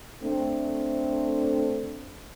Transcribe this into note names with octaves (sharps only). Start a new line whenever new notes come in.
A3 C4 D4